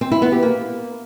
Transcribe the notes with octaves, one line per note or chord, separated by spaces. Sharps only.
C4
E4
B3
G4
A#3